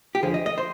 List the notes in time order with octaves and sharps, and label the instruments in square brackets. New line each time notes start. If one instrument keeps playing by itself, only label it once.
[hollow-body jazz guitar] G4
D#2 D3 F3 G#4
D#5
D#5
C5